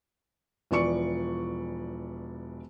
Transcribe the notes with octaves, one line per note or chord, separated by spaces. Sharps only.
E1 E3 F3 D5 C#6 C#7